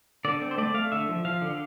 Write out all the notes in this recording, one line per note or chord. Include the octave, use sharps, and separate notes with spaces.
D3 D5
C4
C5
A3 D5
A3 F5
D3 E5
F3
F3 F5
D3